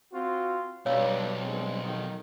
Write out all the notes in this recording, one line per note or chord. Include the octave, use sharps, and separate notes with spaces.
C4 F4 F#4
B1 G2 C#5 F5 E6
G2 G#3 C4
F2 D#3